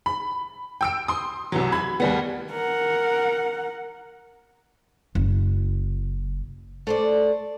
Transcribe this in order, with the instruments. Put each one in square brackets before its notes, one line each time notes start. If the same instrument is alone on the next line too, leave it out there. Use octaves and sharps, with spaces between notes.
[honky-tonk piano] B5
G5 E6 D7
C6 D#6
C2 E3 F#3
B5 G#6
D#2 G3 B3
[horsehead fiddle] A#4 F#5
[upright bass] F#1
[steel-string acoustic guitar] A3 C5 D5